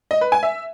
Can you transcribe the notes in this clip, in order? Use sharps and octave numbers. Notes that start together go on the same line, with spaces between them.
D#5
B4
G#5
E5